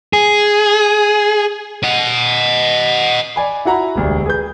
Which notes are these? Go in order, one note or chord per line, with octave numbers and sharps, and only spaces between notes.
G#4
D#5 F#5
D5 G#5 B5
E4 F#4 F#5 A#5 B5
E1 D2 G3
G#4 B4 G6